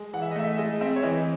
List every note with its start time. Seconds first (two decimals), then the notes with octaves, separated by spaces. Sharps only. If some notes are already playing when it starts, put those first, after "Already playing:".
Already playing: G#3
0.13 E3 F#5
0.22 E5
0.31 D#5
0.36 A3 E5
0.58 G#3 D#5
0.81 C4 E5
0.96 C#5
1.03 E3 D#5